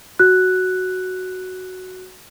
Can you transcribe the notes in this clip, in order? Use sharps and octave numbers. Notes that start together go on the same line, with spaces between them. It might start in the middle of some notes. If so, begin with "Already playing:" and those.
F#4 F#6